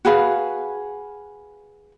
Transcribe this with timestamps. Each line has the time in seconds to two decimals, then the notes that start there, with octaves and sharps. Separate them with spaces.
0.05 F#4 G#4 B4 F5